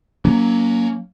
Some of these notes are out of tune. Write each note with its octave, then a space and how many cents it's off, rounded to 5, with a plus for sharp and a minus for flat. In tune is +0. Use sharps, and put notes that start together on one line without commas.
F#3 +0 A#3 +0 C#4 +25